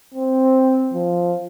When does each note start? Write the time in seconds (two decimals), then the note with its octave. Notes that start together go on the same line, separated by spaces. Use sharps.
0.14 C4
0.94 F3